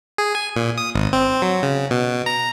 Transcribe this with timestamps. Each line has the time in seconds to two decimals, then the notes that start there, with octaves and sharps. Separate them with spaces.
0.18 G#4
0.35 G#5
0.56 A#2
0.78 D#6
0.95 G#1
1.13 C4
1.42 F#3
1.63 C#3
1.91 B2
2.26 A#5